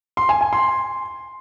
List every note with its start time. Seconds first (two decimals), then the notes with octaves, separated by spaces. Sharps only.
0.17 C6
0.29 G#5
0.41 G#5
0.53 C6